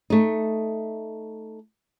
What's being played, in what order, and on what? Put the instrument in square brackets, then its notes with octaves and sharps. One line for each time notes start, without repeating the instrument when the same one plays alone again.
[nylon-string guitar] A3 D#4